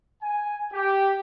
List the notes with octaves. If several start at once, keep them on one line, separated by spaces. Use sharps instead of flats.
G#5
G4